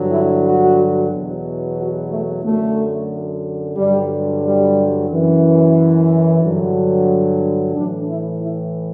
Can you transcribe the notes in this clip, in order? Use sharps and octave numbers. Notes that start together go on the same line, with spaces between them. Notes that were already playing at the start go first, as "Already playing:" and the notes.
Already playing: G2 D3 F#3
E4
F#4
E2 B2 F#3
F#4
A3
F#2 D3 F#3 A3
G2 D3 F#3 G3
G3
F#2 E3
G2 D3 F#3
A2 E3 D4
E4
E4